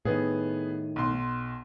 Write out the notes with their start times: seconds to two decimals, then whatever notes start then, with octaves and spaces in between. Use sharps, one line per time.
0.05 A2 D#3 B3 G#4
0.96 B1 C6